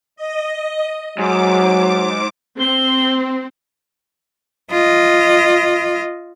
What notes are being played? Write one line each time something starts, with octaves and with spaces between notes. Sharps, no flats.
D#5
G#2 F#3 D6
C4 G7
F4 D#5